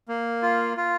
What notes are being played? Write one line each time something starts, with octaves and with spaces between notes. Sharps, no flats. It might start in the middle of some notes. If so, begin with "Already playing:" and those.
A#3
F4
F4